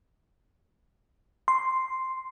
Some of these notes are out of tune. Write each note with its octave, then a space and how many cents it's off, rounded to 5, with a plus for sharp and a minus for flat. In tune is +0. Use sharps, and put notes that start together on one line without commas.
C6 +0